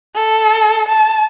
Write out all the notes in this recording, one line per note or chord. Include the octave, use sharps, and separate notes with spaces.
A4
A5